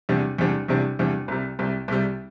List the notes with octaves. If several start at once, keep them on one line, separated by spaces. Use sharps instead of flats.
E2 C3 G3 D4
E2 C3 G3 D4
E2 C3 G3 D4
E2 C3 G3 D4
C2 C3 G3
C2 C3 G3
C2 C3 G3